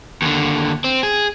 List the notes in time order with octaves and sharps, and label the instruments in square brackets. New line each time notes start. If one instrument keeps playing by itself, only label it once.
[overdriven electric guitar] D#2 D3
C4
G#4